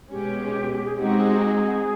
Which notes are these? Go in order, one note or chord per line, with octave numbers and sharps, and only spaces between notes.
B2 G#3 C#4 G4
G#4
G#3 C4 D#4 F#4 G4
G#4